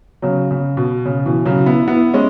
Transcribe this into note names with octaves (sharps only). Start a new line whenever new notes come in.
C#3 F#3
C#3
B2
C#3
B2 E3
C#3 F#3
B3 E4
B3 E4
G#3 C#4